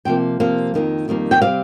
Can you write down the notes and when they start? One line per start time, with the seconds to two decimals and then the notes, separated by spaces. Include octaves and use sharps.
0.05 C3 F3 A#3 G5
0.40 C3 F3 A#3 F5
0.74 F2 D#3 G3 A#3
1.08 F2 D#3 G3 A#3
1.31 G5
1.41 C3 G3 C4 F5